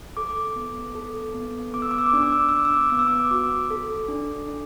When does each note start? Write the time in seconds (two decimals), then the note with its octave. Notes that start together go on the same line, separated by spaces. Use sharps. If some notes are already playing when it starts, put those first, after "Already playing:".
0.17 A4 D6
0.56 B3
0.95 A4
1.35 B3
1.73 B3 D6
1.82 E6
1.91 D6
1.98 E6
2.07 D6
2.13 D4 E6
2.23 D6
2.32 E6
2.40 D6
2.49 E6
2.53 B3 D6
2.65 E6
2.74 D6
2.81 E6
2.90 B3 D6
2.99 E6
3.07 D6
3.31 F#4 D6
3.70 A4
4.08 D4
4.48 D4